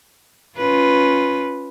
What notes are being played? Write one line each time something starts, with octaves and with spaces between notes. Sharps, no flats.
C#4 F4 B4